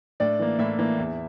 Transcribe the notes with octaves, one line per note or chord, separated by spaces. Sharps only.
A2 D4 D5
E3 A#3
A2 E4 E5
E3 A#3
E2